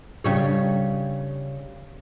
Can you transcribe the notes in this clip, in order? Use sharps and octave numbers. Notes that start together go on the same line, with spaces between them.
C#3 G3 C#5